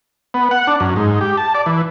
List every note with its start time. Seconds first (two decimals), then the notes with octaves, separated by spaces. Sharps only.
0.34 B3
0.51 F#5
0.67 D4
0.80 F#2
0.96 G#2
1.21 G4
1.37 A5
1.55 D5
1.66 E3